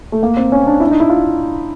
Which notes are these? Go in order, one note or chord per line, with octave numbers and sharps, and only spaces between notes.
A3
A#3
C4
C#4
D4
E4
D4
D#4
E4
F4